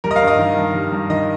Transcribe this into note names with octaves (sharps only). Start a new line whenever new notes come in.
G3 A#4
D#5
F5
G2
D#5
D#3
G2
G3
G2
D#3 D#5